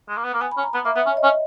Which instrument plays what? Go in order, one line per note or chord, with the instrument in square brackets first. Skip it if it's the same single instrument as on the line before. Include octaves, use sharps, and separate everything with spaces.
[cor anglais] G#3
A#3
B3
A#3
[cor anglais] B3 [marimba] G#5
[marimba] B5
[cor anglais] C#4
[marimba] A#5
[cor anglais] B3 [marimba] B5
[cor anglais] A#3 [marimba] E5
[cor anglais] B3 [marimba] E5
[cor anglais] C#4 [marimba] C#5
[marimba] D#5
[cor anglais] C#4
[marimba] D#5